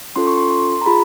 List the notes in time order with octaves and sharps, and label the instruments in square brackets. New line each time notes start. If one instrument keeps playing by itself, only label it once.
[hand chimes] C#4 F4 A4 C6
C#6
C6
C6
A#5
F4 G#4 B5